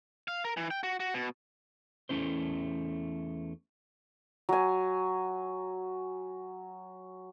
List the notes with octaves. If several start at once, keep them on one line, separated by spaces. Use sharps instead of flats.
F5
A#4
E3
G5
F#4
F#4
B2
E2 A3 C#4 E4 C5
F#3 G#5